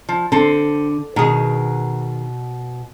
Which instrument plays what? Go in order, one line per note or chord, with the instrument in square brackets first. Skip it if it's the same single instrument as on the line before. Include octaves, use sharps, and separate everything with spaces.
[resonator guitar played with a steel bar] F3
[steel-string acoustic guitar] D3 [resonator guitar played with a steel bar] C4 A4
[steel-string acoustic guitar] B2 [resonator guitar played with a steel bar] D#3 G#4